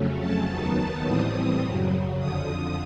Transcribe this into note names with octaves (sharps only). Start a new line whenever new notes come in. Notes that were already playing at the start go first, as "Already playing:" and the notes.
Already playing: F2 C#3 F#3 A3 C#4
A5
D#2 D#3 F#3 B3 D#4 A5
A2 E3 G3 C4 D#6
F#2 C#3 F#3
F2 D3 F3 D#6